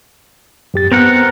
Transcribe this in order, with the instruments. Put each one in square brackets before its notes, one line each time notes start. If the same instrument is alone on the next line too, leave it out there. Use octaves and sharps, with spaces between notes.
[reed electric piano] F#2 G4 A6
[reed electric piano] B3 [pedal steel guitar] C4 A#4 F#5